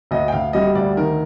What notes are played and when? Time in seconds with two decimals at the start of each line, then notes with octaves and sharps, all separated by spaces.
0.11 D2 D#5
0.28 G5
0.33 D2 F5
0.53 G3 D#5
0.75 D2 D5
0.97 D#3 A#4